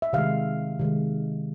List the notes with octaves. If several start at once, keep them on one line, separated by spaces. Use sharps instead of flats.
E5
C3 D#3 G#3 F5
C3 D#3 G#3